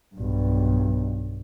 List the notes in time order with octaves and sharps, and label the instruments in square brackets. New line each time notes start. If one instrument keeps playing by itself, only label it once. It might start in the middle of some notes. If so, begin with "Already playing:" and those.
[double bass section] B1 G2